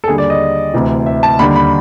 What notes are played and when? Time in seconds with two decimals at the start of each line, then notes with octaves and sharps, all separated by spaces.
0.04 A4
0.08 D#2 D3 G3 G#4
0.18 D5
0.30 D#5
0.74 D2 C3 E3
1.06 E5
1.23 A5
1.39 D#2 D3 G3 B5
1.55 B5